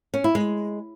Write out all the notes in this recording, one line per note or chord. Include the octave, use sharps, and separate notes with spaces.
C#4
E4
G#3